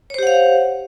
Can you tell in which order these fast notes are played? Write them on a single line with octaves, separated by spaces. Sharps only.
C#5 C5 G4 F#5 F5